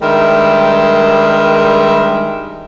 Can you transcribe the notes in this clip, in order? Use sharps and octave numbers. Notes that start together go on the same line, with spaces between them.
G2 D#3 G3 G#3 A#4 E5